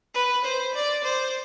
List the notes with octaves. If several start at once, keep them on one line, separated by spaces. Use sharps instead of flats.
B4
C5
D5
C5